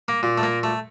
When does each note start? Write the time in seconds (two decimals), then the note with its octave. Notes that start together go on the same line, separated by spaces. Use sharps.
0.08 A#3
0.23 A#2
0.38 A3
0.43 A#3
0.63 A3